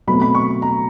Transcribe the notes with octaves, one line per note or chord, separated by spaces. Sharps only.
B2 F#3 A3 C4 B5
B5
C#6
A#5